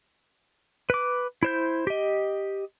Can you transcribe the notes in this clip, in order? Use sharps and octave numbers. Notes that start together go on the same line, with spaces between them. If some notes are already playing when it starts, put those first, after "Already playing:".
B4 D6
E4 C5 G6
G4 D#5